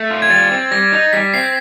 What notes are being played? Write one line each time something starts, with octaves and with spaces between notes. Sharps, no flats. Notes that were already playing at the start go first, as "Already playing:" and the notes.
Already playing: A3
F4
G#6
G3 A6
C4
G3 A#6
D#4
G3 B6
C4 C7